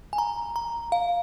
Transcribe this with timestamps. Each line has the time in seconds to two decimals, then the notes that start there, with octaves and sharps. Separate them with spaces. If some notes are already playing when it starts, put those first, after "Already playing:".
0.13 G#5
0.18 A#5
0.56 A#5
0.92 F5